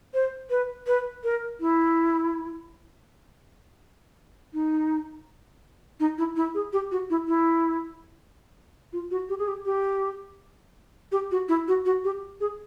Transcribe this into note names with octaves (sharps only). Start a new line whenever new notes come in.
C5
B4
B4
A#4
E4
D#4
D#4
E4
E4
G#4
G4
F#4
E4
E4
F4
F#4
G4
G#4
G4
G4
G4
F#4
E4
F#4
F#4
G4
G#4